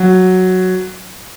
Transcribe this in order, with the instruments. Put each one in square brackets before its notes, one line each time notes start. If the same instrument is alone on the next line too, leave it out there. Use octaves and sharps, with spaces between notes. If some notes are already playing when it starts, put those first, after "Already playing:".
Already playing: [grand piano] F#3